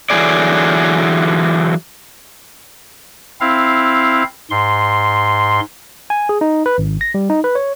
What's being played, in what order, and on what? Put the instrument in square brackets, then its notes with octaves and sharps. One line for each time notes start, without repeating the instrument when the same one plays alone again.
[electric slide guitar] D3 E3 F#3 C4 G#4 D5
[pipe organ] C4 E4 F5
G#2 C6
[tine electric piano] G#5
G#4
D#4
B4
G#1
A#6
G3
D#4
B4
C#5